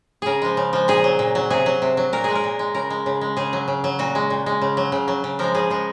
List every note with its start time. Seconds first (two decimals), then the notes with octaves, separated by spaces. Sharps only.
0.22 C#3 G#4 A#4
0.42 F3 G#3
0.57 C#3
0.73 F3 G#3
0.88 A#2 G#4
1.04 F#3
1.19 A#2
1.35 F#3
1.50 C3 G#4
1.66 F#3
1.82 C3
1.97 F#3
2.13 A#2 A#4
2.24 G#3 G#4
2.35 A#4
2.44 A#2
2.59 G#3
2.74 C#3 A#4
2.90 G#3
3.06 C#3
3.21 G#3
3.36 C#3 G#4
3.53 F#3
3.68 C#3
3.84 F#3
3.99 A#2 F#4
4.15 G#3
4.30 A#2
4.46 G#3
4.62 C#3
4.77 F#3
4.92 C#3
5.08 F#3
5.24 C#3
5.39 F3 G#3 A#4
5.55 C#3 G#4
5.70 F3 G#3